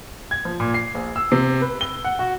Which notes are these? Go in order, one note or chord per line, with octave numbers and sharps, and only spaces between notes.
G#6
F3
A#2
C7
A#1
E6
C3
B4
G7
F#5
F#4